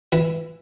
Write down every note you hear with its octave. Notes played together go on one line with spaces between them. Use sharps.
E3 E4